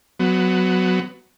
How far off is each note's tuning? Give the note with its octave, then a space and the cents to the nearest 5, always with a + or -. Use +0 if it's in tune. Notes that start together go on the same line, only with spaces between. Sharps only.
F#3 +0 B3 +20